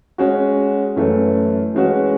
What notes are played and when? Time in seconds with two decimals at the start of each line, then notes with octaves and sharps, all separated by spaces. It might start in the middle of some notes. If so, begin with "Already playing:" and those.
0.18 G#3 C#4 F#4
0.96 F#2 E3 A3 C#4
1.75 E3 G#3 C#4 F#4